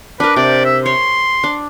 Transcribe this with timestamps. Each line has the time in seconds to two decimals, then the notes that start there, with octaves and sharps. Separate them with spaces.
0.20 D4 A#4 B4
0.36 C3 D5
0.65 E5
0.86 C#5 C6
1.44 D4